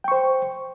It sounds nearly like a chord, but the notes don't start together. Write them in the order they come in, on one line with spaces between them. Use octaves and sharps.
G5 C#6 C5